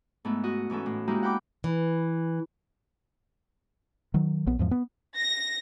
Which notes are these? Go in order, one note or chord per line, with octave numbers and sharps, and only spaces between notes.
G#2 A3 B3 E4
F#4 D#5
G#2 E3 C#4 A4
A2
G#3 A#3 D#4 E4 F#4 G4
F#5 G5 B5 D6
E3
D#3 F#3
A#1 B3
E2 G#2 F3
B3
A#6